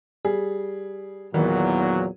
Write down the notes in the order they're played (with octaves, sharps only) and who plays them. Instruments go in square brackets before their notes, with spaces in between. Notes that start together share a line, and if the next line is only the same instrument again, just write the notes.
[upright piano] G3 G#4
[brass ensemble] E2 A#2 F#3 [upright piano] D#3 E3 B3